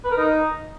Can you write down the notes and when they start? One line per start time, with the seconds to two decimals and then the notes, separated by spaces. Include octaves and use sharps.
0.04 B4
0.11 A#4
0.17 D#4